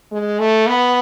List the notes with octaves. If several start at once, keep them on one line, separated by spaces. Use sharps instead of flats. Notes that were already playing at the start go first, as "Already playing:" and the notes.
G#3
A3
B3